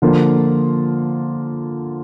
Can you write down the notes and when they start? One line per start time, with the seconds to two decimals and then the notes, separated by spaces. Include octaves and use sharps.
0.02 D3 F3 A#3 F4